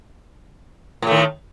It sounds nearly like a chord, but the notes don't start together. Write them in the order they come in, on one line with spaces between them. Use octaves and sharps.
A2 A3 D#3